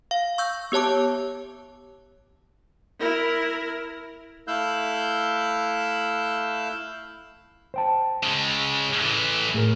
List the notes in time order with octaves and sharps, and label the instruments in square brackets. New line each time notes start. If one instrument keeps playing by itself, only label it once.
[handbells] F5
C#6 E6 G6
B3 G4 C#5 A5 D6
[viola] E4 A#4
[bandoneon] A3 E4 F5 E6 F#6 G6
[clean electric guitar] C5 G5 A5
[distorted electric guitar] C#3 G#3
A2 E3
[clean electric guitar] A2 G#4 A#4